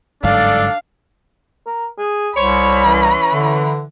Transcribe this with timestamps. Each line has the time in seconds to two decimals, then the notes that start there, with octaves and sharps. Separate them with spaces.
0.23 G1 G#2 F#3 D4 A4 D5 F5
1.66 A#4
1.98 G#4
2.37 C2 C5 C#5 B5
2.84 E3 C#4
3.32 D3